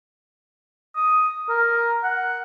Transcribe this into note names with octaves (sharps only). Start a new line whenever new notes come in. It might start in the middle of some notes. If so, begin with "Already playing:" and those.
D#6
A#4
F#5